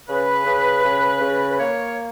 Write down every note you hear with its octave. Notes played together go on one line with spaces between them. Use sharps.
C#3 B4
C#3
C#3
C#3
B4
A#3 C#5